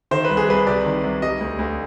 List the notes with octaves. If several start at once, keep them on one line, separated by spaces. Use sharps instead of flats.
D#3 C5
C2 B4
G#4
C2 B4
C3 D5
D#3
C2
G3 D#5
D2
D2